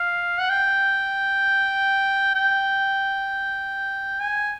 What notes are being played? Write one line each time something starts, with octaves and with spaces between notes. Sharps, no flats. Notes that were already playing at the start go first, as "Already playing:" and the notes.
Already playing: F5
F#5
G5
G5
G#5